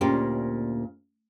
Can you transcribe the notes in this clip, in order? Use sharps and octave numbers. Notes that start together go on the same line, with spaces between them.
D2 A#2 A#3 C#4 G4 C5